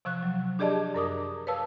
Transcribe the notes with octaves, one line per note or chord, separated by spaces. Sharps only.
C3 F3 C#6 F#6
F#3
D4 G4 G#4 D5 D#5 A5
F#2 A#4 D6 D#6
B4 C#5 F5 A5 E6